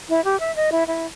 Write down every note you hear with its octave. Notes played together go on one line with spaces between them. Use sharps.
E4
G4
E5
D#5
E4
E4